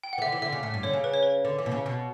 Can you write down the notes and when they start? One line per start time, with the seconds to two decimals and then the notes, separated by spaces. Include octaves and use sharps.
0.03 G5
0.13 F#5
0.18 E3
0.22 D3 E5
0.32 E3
0.42 D3 E5
0.52 C#3
0.63 A2 E5
0.74 G2
0.83 D3 C#5
0.93 C#3
1.04 B4
1.14 C#5
1.23 B4
1.45 D3
1.58 E3
1.66 B2
1.72 C#3
1.86 B2